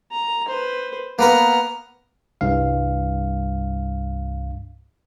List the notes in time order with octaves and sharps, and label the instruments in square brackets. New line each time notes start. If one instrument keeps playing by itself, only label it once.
[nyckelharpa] A#5
B4 C5
[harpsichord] A#3 B3 A#4 [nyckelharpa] A#5
[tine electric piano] C2 G2 F5